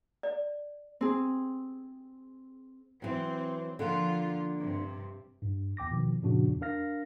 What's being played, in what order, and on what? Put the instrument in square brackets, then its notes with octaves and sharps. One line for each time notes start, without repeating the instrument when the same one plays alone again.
[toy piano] D5
[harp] C4 G#4
[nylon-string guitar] E3 F#3 [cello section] C4
[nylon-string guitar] D3 A#3 F#5 [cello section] F3 F4
[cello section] G2 C3
[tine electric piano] G2
E2 G5 D6 A#6
B2 D#3 F3
F#2 A#2 C#3 F3 D4 F#4
E2
D4 A#4 F5 F6 A#6